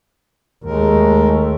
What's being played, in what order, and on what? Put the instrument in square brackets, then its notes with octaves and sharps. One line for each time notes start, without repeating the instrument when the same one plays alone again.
[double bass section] D#2 A3 [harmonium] G#3 A#4